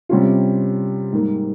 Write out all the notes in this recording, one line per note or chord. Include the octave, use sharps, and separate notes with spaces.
C3 G3 C#4 F4
G#2 G3 A#3